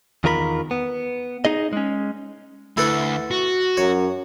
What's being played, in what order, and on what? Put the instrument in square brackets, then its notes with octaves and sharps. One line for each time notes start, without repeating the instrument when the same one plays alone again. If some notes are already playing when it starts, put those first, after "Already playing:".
[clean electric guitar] E2 D#3 F4 A#4 B4 B5
B3
D#4 G#4 D#5
G#3 C#4
[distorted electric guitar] D2 [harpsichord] E4 A4 B4
[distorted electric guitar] F#4
[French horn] F#2 [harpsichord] C#5